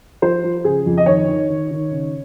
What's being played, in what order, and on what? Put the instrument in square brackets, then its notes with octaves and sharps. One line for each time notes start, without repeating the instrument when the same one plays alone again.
[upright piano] F3 C5
F3
C#3 G#4
F2
D#5
D#3 C#5
D#3
D#3
D#3
C#3